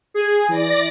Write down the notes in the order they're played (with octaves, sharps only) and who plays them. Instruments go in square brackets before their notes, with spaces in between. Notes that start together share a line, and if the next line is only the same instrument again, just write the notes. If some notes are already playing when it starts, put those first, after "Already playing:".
[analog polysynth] G#4
[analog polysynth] E3 [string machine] D5 A#6